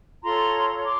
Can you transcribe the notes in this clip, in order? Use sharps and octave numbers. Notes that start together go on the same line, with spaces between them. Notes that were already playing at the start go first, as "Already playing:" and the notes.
F4 A4 C#5 A#5 C6
C6 D6